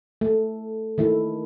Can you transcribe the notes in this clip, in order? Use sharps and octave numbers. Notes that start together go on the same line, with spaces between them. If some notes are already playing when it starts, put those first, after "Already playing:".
A3
D#3 A3 E4